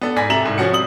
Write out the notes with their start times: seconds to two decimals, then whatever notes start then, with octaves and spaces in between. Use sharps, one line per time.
0.01 B3 D4 A4
0.16 G#2 D5 G#5 A#6 B6
0.30 C3 A4 E5 A#5 E7 F#7
0.43 C2 G#2
0.58 F3 C#4 F#4 C#7
0.72 C3 G3 D#6 F#7